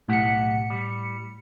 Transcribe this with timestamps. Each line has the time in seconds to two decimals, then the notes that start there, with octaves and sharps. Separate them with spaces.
0.09 B1 A2 G4 F#5 C#7
0.70 G3